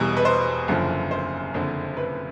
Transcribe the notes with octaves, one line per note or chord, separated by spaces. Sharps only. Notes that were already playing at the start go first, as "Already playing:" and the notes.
Already playing: E1 E2 B2 G3
B4
C5
F#1 F#2 D3 F3
C5
F#1 F2 D3
B4